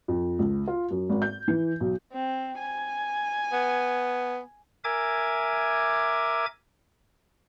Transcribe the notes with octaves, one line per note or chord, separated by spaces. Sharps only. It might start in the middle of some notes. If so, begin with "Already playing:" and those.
F2
C#2
F4
F#2
G#1
G6
E3
B1
C4
G#5
B3
A#4 E5 G#5 D6 G#6